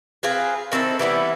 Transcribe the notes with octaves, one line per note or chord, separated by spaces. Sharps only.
C4 F4 G#4 B4
D#3 C4 E4 A4
E3 G3 B3 E4